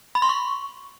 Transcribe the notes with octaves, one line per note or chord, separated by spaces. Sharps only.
B5
C6
C#6